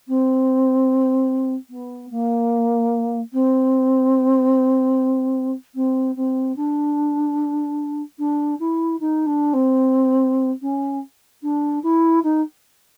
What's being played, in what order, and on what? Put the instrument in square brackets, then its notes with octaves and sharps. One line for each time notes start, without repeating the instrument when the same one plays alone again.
[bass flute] C4
B3
A#3
C4
C4
C4
D4
D4
E4
D#4
D4
C4
C#4
D4
E4
D#4